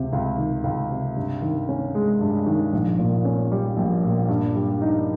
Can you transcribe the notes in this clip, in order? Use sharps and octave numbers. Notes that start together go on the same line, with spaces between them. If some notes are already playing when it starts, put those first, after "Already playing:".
Already playing: C#2 C3
C#2
D#3
C#2
C3
G2
D#3
C#4
G#3
G2
D#3
A#1
A#2
C#4
G3
A#1
A#2
G2
G3
D#4